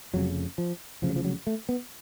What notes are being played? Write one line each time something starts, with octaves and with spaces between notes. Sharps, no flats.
F1 F2 C#3 F#3
F3
F1 F2 C#3 F3
F#3
F3
F#3
A3
B3